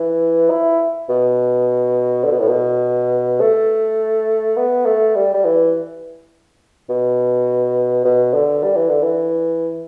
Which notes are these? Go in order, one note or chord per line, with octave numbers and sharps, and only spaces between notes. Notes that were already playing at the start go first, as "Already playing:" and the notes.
Already playing: E3
E4
B2
D3
B2
A2
B2
A3
B3
A3
G3
G3
E3
B2
B2
D3
G3
E3
D3
E3